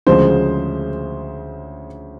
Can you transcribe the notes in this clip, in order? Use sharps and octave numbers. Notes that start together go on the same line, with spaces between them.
D2 C#3 F3 G#3 C5